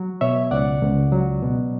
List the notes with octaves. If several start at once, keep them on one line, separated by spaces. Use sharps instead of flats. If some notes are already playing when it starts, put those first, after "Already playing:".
Already playing: F#3
B2 C#5 E5
C#2 D5 F#5
C#2
F#3
B2